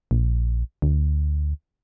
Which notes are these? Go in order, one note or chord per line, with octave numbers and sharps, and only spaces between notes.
A#1
D2